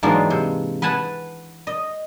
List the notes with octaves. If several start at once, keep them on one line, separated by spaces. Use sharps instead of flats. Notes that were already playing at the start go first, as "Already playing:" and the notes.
G#2 E3 F#3 A#3 D4 F4
C3
B4 F#5 G#5 A5
D#5